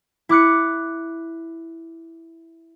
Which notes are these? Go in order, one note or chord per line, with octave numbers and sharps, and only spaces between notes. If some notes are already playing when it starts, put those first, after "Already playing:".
E4 D6 F#6 C#7